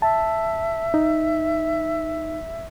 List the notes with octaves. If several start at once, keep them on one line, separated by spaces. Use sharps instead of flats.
E5 A5
D#4